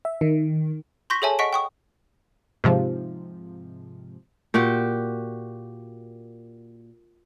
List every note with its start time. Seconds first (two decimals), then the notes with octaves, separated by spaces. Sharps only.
0.05 E5
0.21 D#3
1.10 C6 C#6 G6 A#6 B6
1.22 G#4 A4 C#5 E5 G#5 A5
1.39 D#5 F#5 C#6 B6 D7
1.53 G5 C#6 D#6
2.64 G#2 C3 F3
4.54 A#2 F#4 G4 G5